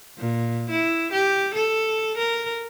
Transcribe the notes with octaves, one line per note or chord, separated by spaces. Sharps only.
A#2
E4
G4
A4
A#4